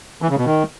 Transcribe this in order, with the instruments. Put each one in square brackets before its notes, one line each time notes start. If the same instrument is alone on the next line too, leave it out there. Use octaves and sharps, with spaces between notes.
[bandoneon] E3
C#3
B2
D#3